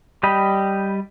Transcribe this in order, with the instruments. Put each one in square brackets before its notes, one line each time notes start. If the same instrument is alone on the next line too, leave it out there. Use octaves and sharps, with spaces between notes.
[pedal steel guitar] G3 G4 D#5 B5